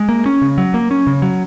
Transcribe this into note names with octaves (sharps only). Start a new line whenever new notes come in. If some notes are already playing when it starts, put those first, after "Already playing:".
Already playing: G#3
A#3
C#4
C#3
F#3
A#3
C#4
C#3
F#3